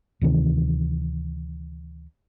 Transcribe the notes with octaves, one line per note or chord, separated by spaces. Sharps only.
D2 C3 D#3 E3